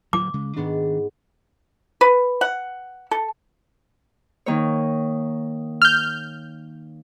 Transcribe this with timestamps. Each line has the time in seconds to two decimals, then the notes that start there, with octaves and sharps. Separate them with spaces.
0.13 D1 D#2 F#3 D6
0.34 C#3 G#3
0.56 G#2 D#3 B3 D4
2.01 B4
2.41 F#5
3.11 A4
4.46 D#3 A#3 C#5
5.82 F6 G6